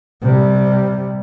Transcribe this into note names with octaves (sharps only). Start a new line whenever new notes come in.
C3 G3